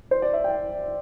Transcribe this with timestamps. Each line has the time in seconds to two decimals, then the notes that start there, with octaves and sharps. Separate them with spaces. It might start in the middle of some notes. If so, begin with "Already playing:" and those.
0.11 C5
0.22 D5
0.33 E5
0.44 G5